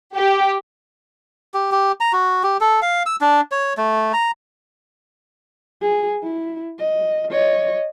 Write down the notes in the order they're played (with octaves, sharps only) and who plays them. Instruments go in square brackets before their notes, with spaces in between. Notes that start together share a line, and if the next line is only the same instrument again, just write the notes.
[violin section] G4
[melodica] G4
G4
A#5
F#4
G4
A4
F5
E6
D4
C#5
A3
A#5
[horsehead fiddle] G#4
E4
D#5
C#5 D#5